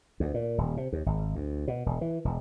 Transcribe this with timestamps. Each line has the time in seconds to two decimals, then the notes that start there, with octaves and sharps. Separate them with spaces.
0.20 D2
0.34 A#2
0.58 D#1
0.77 C3
0.93 D#2
1.06 G#1
1.35 D2
1.68 B2
1.86 E1
2.01 E3
2.25 E1